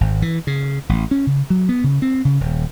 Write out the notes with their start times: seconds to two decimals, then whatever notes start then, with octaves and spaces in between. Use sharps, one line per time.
0.01 G#1
0.22 E3
0.47 C#3
0.89 A1
1.11 C#4
1.27 C#3
1.50 F#3
1.69 B3
1.84 C#3
2.02 C4
2.25 C#3
2.40 D#1